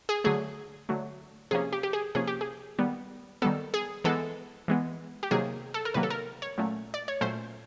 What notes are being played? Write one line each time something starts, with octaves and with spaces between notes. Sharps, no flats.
G#4
D3 F#3 A3 G#4
D3 F#3 A3
C3 F3 A#3 C#4 G#4
G4
G4
G#4
C3 F3 A#3 C#4 G#4
G4
G#4
D#3 G3 B3
D#3 G3 B3 A4
G#4
E3 G#3 B3 A4
E3 G#3 B3
G4
C3 D#3 F#3 A#3 G#4
A4
A#4
C3 D#3 F#3 A#3 B4
A4
A#4
C#5
A#2 F#3 A3 C#4
D5
C#5
A#2 F#3 A3 C#4 C5